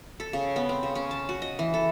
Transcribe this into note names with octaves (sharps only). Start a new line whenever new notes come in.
A4
C#3
B3
C4
C#3
C#4
A5
F#4
D#5
E3
A4